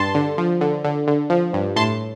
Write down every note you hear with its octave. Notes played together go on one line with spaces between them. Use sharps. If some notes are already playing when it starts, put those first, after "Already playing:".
Already playing: G2 A5 C6
D3
F3
D3
D3
D3
F3
G2
A2 A5 C6